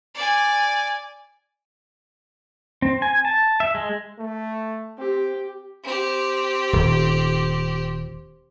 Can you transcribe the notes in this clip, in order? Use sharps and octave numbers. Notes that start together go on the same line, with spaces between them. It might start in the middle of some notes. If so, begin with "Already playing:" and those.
D5 G#5
C4
G#5
A5
E5
G#3
A3
C4 G4
C4 G4
D#1